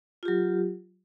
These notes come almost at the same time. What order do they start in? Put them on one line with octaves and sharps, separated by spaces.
F4 G4 F#3